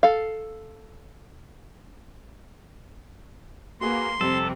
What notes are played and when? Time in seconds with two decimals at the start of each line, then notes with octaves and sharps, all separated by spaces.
0.03 A4 F5
3.81 A#3 F#4 G#4 B4 C6
4.21 F2 C3 G3 A4